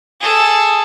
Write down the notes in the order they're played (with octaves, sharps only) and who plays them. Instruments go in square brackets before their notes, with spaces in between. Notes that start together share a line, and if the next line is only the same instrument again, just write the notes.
[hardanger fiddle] G#4 A4